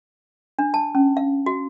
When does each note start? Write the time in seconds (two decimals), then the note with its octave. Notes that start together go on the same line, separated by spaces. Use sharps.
0.59 D4
0.74 A5
0.95 C#4
1.17 F5
1.46 F#4